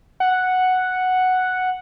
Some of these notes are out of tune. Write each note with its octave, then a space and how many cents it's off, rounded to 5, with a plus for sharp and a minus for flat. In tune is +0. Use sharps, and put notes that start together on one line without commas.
F#5 +0